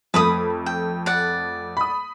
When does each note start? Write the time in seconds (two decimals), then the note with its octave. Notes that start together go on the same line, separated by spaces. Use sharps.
0.14 F2 A3 B4 B5 D#6
0.66 G5
1.06 D5 F#5
1.77 B5 D#6